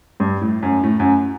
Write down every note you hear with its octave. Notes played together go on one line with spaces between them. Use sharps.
G2
A2
F#2
A2
F#2